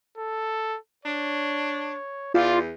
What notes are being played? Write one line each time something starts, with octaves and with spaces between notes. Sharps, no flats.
A4
D4 C#5
E2 F4 D5